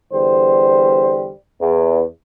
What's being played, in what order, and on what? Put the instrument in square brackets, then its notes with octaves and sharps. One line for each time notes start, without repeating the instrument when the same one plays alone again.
[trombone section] E2 D3 G3 C5
E2